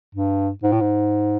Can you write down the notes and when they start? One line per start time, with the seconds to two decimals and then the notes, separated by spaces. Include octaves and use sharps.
0.15 G2
0.63 G#2
0.72 A2
0.81 G#2